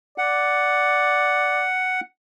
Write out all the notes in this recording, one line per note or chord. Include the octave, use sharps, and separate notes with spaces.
D5 F#5